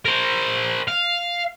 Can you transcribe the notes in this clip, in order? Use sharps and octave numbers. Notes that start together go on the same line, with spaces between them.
A#4 C5
F5